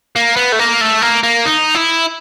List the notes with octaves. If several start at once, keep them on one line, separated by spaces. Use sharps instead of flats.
A#3
B3
A3
A#3
A3
A#3
A#3
D#4
E4